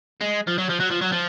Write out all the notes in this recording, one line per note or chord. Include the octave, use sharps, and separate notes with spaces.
G#3
F3
F#3
F3
F#3
F3
F#3
F3